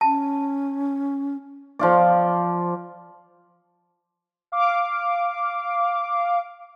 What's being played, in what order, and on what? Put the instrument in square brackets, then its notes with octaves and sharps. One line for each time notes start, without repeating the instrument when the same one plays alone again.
[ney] C#4 [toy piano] A5
[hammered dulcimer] F3 F4 D5
[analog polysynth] F5 D6